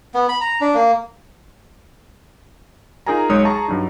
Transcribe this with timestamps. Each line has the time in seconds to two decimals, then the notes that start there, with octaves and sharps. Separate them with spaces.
0.14 B3
0.29 B5
0.41 A#5
0.61 D4
0.74 A#3
3.06 D#4 F4 G#4 A#4 G#5 A#5
3.29 B1 G#3 D#4 C#5 D#6
3.45 G#4 A5 A#5 C#6
3.68 G2 F#3 D#4